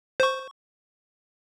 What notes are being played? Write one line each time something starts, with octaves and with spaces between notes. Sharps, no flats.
C5 C#6